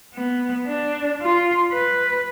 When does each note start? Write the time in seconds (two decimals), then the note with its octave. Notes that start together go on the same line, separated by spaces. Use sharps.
0.14 B3
0.67 D4
1.21 F4
1.72 B4